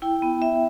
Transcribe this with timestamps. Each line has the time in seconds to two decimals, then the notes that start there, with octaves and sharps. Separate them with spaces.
0.02 E4 G5
0.22 B3
0.41 E4 E5